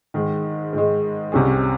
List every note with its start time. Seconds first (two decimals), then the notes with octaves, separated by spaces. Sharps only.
0.14 G#2 D#3 G#3
0.73 G#2 D#3 G#3
1.32 C2 C3 G3 C#4 G#4